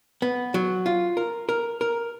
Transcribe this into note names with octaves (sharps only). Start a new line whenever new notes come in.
B3
F#3
F4
A#4
A#4
A#4